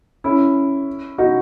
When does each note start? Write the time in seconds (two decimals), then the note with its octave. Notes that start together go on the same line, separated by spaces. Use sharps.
0.24 C#4 E4
1.18 D#4 F#4